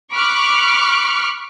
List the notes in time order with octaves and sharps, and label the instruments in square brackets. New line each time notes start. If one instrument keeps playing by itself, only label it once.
[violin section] B5 C#6 D6 F6 F#6 C#7